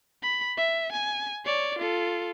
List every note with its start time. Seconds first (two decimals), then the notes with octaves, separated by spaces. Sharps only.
0.23 B5
0.57 E5
0.93 G#5
1.45 C#5 D5
1.79 F4 A4